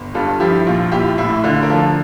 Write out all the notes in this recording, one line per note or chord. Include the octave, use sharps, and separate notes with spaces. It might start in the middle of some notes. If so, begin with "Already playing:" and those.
Already playing: G1
G2 F4 A4
F3 E4 G4
A#1 F4
A#1 E4 G4
A2 E4
D3 F4
A#4
F3 F4 A4